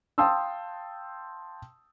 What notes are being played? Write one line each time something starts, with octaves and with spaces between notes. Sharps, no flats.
F5 G5 A5 C6 D#6 E6